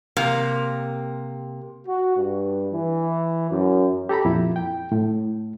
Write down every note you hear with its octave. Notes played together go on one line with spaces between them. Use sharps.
C3 A#3
F#4
G2
E3
F#2
G4 A4 A#5 B5
F2 A#2 E4
G5
A2